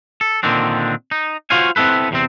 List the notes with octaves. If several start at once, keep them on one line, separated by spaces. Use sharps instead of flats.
A4
A#2 D3 D#3 C4 D4
D#4
F4 F#4 C5 C#5 F5 G#5
B3 C4 E4 A4 B4
E2 C3 C4